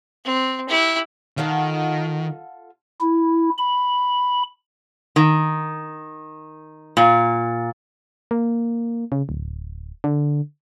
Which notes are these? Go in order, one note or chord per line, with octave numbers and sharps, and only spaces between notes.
C4
E4 G4
D#3 F4 A4 F#5
E4
B5
D#3
A#2
A#3
C#3
D1
D3